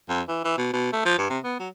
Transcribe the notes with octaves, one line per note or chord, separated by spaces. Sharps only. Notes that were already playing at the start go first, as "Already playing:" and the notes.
F2
E3
E3
B2
B2
A3
F3
G2
C3
B3
F#3